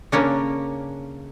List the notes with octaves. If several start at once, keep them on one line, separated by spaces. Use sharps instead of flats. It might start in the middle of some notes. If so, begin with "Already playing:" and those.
C#3 A#3 C#4 D4